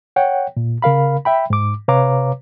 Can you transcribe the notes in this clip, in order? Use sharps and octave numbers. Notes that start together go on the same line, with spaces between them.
C#5 F#5 G5
A#2
C#3 A#4 F5 B5
E5 G5 B5
G#2 D6
C3 B4 C#5 F5 A#5 D6